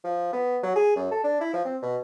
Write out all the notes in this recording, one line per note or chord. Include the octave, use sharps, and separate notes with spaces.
F3
B3
F#3
G#4
F#2
A4
D4
E4
F3
C4
B2